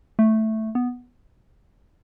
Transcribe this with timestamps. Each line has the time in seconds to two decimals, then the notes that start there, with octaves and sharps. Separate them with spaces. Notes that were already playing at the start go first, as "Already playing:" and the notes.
0.19 A3
0.75 B3